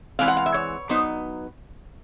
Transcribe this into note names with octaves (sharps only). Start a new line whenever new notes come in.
E3 G#3 C4 F5
F#5
F5
E5
C#5
F#3 B3 D#4 C5